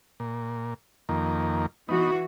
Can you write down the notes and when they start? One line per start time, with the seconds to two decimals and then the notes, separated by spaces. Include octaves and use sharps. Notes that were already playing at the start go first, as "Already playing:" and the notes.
0.20 A#2
1.09 F2 D#3 A#3
1.89 E3 B3 D#4 F#4